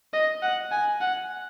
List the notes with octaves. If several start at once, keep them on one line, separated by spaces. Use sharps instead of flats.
D#5
F#5
G#5
F#5